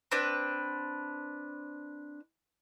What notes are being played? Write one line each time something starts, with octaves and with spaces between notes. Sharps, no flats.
C4 D4 B4